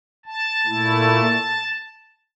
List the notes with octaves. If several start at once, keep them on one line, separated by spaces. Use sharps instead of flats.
A5
A#2 A3 E4